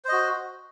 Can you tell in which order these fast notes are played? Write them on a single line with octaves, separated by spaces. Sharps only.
C5 D#5 F#4